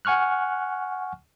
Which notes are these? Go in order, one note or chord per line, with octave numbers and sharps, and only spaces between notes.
F#5 G#5 C#6 F6 F#6